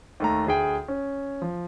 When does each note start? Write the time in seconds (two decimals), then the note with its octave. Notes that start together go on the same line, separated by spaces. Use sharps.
0.20 D#2 A3 A#5
0.47 D2 G#4 G5
0.88 C#4
1.42 F3